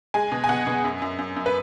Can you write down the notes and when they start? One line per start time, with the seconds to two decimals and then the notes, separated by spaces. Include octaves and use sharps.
0.14 G#3 G#5
0.32 B2
0.44 G#5
0.49 B2 F#5
0.67 B2
0.84 F#2
1.02 F#2
1.19 F#2
1.36 F#2
1.46 B4